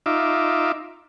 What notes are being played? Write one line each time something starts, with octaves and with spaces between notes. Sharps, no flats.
D#4 F4 E5 D6